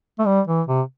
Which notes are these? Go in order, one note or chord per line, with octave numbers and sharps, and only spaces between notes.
A3
G3
E3
C3